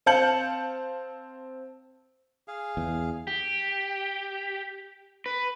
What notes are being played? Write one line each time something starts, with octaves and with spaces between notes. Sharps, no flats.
C4 F5 A5 G6 C#7 F#7
G#4 F5
E2
G4
B4